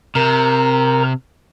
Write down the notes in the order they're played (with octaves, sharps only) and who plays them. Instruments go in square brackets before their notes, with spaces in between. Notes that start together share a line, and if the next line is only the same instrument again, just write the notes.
[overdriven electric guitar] C3 [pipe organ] A#4 A#5